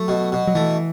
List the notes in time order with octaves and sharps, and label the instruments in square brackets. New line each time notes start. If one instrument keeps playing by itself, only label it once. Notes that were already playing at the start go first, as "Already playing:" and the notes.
Already playing: [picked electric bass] F#3 [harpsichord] A3
[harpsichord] B2
B2
[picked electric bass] F#3
[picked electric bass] E3 [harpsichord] A3